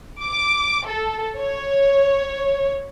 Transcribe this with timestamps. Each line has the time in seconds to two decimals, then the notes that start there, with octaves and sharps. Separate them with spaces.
0.23 D6
0.85 A4
1.37 C#5